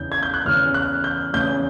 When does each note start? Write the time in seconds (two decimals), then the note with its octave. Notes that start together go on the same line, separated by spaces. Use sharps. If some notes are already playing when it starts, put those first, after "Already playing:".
Already playing: E2 C#3 E3 G6
0.12 G#6
0.23 G6
0.34 F#6
0.45 E2 C#3 E3 F6
0.74 F#6
1.04 G6
1.34 E2 C#3 E3 G6